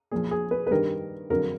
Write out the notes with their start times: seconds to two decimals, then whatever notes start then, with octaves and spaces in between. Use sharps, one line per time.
0.11 A#2 F3 G#4
0.31 G#4
0.51 B4
0.67 B4
0.71 G2 D#3 G3 A#4
1.30 F2 D3 F#3 A#4